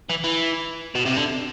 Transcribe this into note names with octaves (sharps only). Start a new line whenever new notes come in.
E3
E3
B2
C3
D3